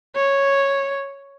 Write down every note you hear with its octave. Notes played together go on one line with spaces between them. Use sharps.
C#5